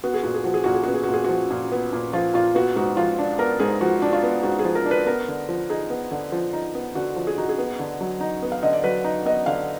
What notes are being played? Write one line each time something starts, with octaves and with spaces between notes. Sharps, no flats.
B3 F#4
G#4
A#2 F#4
G#4
F3 F#4
G#4
A#2 F#4
G#4
B3 F#4
G#4
F#4
A#2
G#4
F3 F#4
A#2
B3
A#2
F3 F4
A#2 F4
B3 F#4
G#2 F#4
F3 F4
D4
B3 A#4
G#2 G#4
F3 F#4
D4
F4
B3
G#2 F#4
F3 G#4
A#4
D4
B4
B3 A#4
D3
F3
D#4 G#4
B3
D3
F3
D#4
B3
D3 F#4
F3
G#4
D#4 F#4
G#4
B3
D3
F#3
D#4
B3
F5
D3 D#5
D5
F#3 B4
D#4
B3 D#5
D3 F5